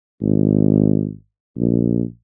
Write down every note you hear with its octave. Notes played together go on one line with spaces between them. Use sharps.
G#1
A#1